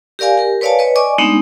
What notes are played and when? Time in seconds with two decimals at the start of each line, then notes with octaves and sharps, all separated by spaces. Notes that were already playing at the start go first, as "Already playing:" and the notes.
0.19 G4 A#4 D5 F5 G#5
0.38 G4 A#4
0.61 B4 C#5 D5 F5 G#5 A5
0.79 B4 C#5 D#5
0.96 D5 D#5 G#5 C#6 D6
1.18 G#3 A3 B3 C4 D4 D#4